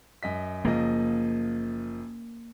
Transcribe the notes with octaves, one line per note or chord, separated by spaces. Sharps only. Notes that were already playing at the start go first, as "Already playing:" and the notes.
F#2 D#5 B6
F#1 F3 A#3 D#5